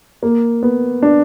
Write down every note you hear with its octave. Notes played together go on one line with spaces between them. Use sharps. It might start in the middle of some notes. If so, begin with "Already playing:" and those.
A#3
B3
D4